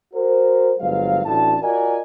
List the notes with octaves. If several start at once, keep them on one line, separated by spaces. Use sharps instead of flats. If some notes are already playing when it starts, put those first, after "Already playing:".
F#4 A#4 C5
G1 F#3 G#3 B4 C5 F5
A1 A2 D4 F#4 A5
F4 F#4 A#4 D5 D#5 G#5